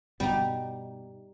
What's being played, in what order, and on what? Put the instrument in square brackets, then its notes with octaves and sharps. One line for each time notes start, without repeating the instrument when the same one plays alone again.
[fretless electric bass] G2 B2 B3 [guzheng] G3 D#4